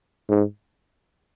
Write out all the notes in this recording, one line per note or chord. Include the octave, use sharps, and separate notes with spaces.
G#2